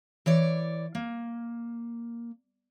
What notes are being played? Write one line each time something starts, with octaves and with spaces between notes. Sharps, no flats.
E3 C#5 D5
A#3